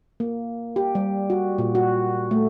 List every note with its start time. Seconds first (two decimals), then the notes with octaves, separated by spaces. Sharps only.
0.20 A#3
0.76 G4
0.95 G3
1.30 F#4
1.58 A#2
1.75 F#4
2.31 A3